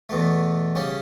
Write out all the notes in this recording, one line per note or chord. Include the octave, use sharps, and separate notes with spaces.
E2 B2 A3
C#3 G3 C#4